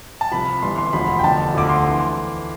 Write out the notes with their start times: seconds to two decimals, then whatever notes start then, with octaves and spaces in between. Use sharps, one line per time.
0.21 A5
0.31 C2 C3 F3 B5
0.62 G1 G2 E3 C6
0.78 C6
0.93 E1 D2 D3 F3 B5
1.19 G5
1.24 F1 E2 D3 F3 A5
1.54 D2 D3 F3 D6
1.70 C6
1.89 E3